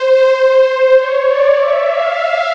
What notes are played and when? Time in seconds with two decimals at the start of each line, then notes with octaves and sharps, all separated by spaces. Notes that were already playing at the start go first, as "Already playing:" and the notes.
Already playing: C5
0.96 C#5
1.25 D5
1.56 E5
1.87 F5